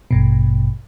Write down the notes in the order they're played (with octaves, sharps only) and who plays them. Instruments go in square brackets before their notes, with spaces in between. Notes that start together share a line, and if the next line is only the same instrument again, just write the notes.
[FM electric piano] A1 G2 B2